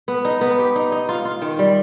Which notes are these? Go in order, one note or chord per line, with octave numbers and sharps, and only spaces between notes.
B3
D#4
B3
G4
D#4
D#4
F4
F4
D#3
G3